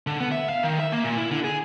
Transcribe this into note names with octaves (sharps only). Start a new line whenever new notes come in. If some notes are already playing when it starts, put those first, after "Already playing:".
D3
B3
E5
F5
D#3
E5
A#3
A#2
E4
D3
G#4